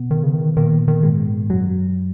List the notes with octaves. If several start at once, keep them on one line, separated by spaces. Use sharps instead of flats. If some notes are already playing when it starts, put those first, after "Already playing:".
Already playing: B2 B3
D#3
C#3
D#3
A#2 D#3 A#3
D#3
G#2 G#3
F#2 F#3